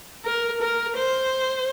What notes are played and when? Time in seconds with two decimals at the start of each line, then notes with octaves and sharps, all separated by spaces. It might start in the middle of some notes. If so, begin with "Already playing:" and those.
0.25 A#4
0.61 A#4
0.96 C5